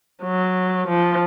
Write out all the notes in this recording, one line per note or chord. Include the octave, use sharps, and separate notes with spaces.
F#3
F3